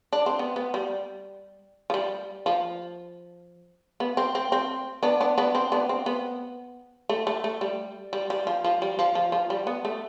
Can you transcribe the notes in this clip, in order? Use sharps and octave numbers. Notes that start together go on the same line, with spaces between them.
D4
C4
B3
B3
G3
F3
G3
F3
B3
C4
C4
C4
B3 D4
B3 D4
B3 D4
C4
B3 D4
C4
B3
A3
A3
A3
G3
G3
G3
F3
F3
G3
F3
F3
F3
G3
B3
A3